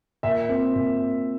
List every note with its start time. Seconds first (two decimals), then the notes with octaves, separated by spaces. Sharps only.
0.23 A#2 E5
0.49 C4
0.76 A#2